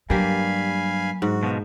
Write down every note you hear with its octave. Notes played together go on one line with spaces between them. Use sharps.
G2 F#3 A#3 G4 F5 G#5 B5
G#2 F#4
B2 F3